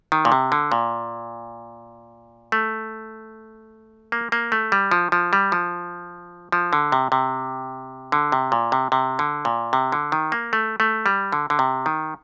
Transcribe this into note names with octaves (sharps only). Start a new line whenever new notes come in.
D#3
A#2
C3
D3
A#2
A3
A#3
A#3
A3
G3
F3
F3
G3
F3
F3
D3
C3
C3
D3
C3
A#2
C3
C3
D3
A#2
C3
D3
D#3
A#3
A3
A3
G3
D3
D3
C3
D#3